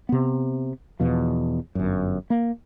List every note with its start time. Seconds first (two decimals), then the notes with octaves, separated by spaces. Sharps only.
0.09 C3 B3
1.00 E2 B2 F3
1.75 G1 F#2
2.30 A#3